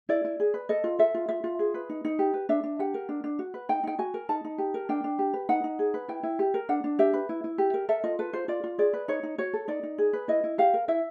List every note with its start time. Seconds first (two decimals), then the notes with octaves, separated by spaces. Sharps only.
0.09 E4 D5
0.24 E4
0.40 G#4
0.54 B4
0.69 A4 D#5
0.84 F4
0.99 A4 E5
1.14 F4
1.29 F4 E5
1.44 F4
1.59 G#4
1.74 B4
1.89 D#4
2.05 D#4
2.19 G4
2.34 B4
2.49 D4 E5
2.64 D4
2.79 G4 F#5
2.94 A#4
3.09 D4
3.24 D4
3.39 F#4
3.54 B4
3.69 D#4 G5
3.84 D#4 G5
3.99 F#4 G#5
4.14 A#4
4.29 D#4 A5
4.44 D#4
4.58 G4
4.74 A#4
4.89 D4 G5
5.04 D4
5.19 G4
5.34 B4
5.49 D#4 F#5
5.64 D#4
5.79 G#4
5.94 B4
6.08 E4 G5
6.23 E4
6.39 G4
6.54 A#4
6.69 D4 F#5
6.84 D4
6.99 G4 E5
7.13 B4
7.29 E4
7.44 E4
7.58 G4
7.74 A#4
7.89 A4 E5
8.04 F4 D#5
8.19 A4 B4
8.33 F4 C5
8.48 F4 D5
8.64 F4
8.78 G#4 D5
8.93 B4
9.08 D#4 C#5
9.23 D#4
9.38 F#4 C#5
9.53 A4
9.68 D#4 D5
9.83 D#4
9.98 G#4
10.13 B4
10.28 E4 D#5
10.44 E4
10.58 G4 F5
10.74 A#4
10.88 E4 E5